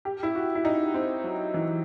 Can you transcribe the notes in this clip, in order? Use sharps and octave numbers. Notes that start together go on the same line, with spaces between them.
G4
E4
F#4
E4
D#4
C4
F#3
E3